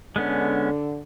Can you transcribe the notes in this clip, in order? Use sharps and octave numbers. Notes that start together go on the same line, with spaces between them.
D3 G#3 B3 C#4